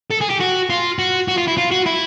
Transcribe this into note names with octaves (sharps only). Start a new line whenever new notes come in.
A4
G#4
G4
F#4
F4
F#4
F#4
F4
E4
F4
F#4
E4